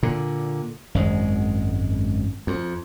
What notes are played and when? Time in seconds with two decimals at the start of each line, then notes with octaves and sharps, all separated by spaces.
0.03 A#2 D3
0.95 G#1 F#2 G#3
2.47 F2